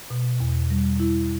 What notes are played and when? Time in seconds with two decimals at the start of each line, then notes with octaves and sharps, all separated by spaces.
0.10 B2
0.40 E2
0.70 G3
1.00 E4